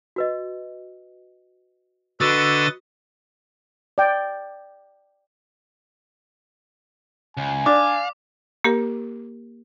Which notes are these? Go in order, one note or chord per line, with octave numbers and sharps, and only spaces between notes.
F#4 B4 D#5
D3 F#4 B4 D#5 C#6 E6 A6
D5 G5
C#2 G#5
D4 F5 D6
A#3 G4 A#4